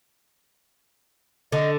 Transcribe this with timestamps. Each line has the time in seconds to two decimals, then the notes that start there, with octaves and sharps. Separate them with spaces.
1.52 D3 D#5